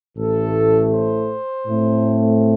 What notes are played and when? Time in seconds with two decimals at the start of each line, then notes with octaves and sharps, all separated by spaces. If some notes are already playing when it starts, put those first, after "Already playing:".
0.17 A1 A2 A3 A4
0.91 C5
1.67 A2 A3 C4